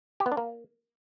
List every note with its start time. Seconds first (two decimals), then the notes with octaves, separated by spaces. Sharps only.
0.20 G4
0.26 B3
0.32 D4
0.37 A#3